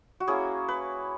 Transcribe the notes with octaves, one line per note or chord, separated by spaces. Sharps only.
F#4
A#3 C#4 E4 G#4
B4